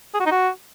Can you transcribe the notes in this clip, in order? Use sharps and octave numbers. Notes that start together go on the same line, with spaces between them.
G#4
F#4
D#4
F#4